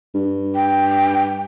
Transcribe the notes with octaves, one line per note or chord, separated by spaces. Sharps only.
G2
G5